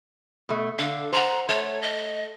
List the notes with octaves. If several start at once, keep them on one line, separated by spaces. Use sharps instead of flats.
B2 A3
D3 F5
C5 F#5 A#5
A3 C#5
D#5